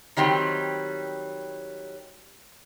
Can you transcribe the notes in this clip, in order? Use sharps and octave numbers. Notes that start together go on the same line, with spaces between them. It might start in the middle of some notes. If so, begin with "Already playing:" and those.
D#3 F#3 G3 C4